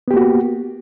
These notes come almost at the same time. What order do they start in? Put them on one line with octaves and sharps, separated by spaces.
B3 G4 A#3 F#4